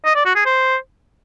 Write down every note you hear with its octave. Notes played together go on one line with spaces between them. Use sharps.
D#5
D5
F#4
G#4
C5